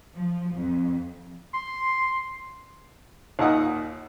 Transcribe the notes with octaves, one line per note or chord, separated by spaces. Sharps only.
F3
F2
C6
D#2 A#2 D#4 F#5 D#6